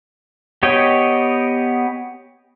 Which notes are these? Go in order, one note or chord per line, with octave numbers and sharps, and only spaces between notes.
B3 G4 C#5 D#5 G5